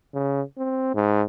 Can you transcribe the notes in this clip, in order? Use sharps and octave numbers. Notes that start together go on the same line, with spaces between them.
C#3
C4
G#2